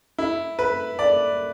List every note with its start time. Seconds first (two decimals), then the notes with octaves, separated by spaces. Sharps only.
0.18 E4
0.59 B4
0.99 D5